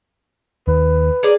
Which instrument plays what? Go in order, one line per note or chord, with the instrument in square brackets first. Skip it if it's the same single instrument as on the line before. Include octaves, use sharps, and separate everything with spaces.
[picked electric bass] D#2 [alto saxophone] B4
[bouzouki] G#4 A#4 D5